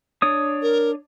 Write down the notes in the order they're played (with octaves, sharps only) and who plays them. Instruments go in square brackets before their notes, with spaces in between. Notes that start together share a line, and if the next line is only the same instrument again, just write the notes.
[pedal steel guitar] D4 C#5 D#6
[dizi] A#4